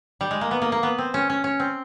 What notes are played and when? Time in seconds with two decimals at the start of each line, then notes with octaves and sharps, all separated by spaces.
0.21 G3
0.31 G#3
0.41 A#3
0.51 B3
0.62 A#3
0.72 A#3
0.83 B3
0.98 C4
1.14 C#4
1.30 C#4
1.44 C#4
1.60 C4